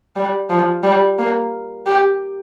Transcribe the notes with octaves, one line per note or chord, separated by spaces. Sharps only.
G3
F3
G3
A#3
G4